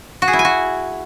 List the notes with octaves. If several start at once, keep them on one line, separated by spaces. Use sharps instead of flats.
F#4
G#4
E4
G#5
F#4